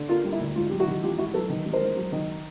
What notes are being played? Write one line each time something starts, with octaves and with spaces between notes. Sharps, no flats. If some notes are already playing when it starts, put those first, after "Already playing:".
Already playing: D3
A#3 F4
G3
E4
D2
G#2 F4
F#3 G4
E4 F#4
D#3
A1 F4 G4
G#2 E4 F#4
F#3 A4 B4
D#3
A1
A#4 C5
G#2
F#3
D#3